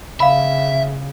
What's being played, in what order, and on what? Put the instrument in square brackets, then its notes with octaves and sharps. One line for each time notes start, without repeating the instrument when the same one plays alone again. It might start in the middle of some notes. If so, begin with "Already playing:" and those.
[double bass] C#3 [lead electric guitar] E5 [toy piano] F5 B5